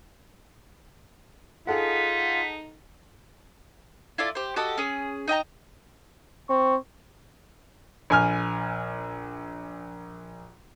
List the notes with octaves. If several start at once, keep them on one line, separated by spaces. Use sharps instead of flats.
D#4 F4 G#4 A4 F#5 B6
E4 F4 A4 D5
G4 C5
F#4 G4 A4 D#5
C#4 G#4
D#4 D#5 G5 A#5
C4 C#6
A#1 G#5 F6